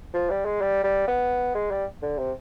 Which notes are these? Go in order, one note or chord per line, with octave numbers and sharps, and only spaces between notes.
F3
G3
G#3
G3
G3
B3
G#3
G3
D3
C3